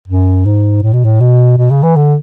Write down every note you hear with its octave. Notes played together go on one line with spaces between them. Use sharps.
F#2
G#2
A2
B2
A2
B2
B2
C#3
E3
D3